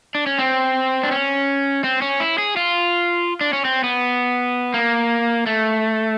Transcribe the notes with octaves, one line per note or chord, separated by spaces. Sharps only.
D4
C#4
C4
D4
C#4
C4
C#4
E4
G#4
F4
D4
C#4
C4
B3
A#3
A3